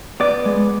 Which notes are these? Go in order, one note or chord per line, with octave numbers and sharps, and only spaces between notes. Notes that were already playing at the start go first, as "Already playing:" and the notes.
B3 D5
G#3